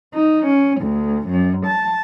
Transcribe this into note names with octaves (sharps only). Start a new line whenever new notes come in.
D#4
C#4
D2
F#2
A5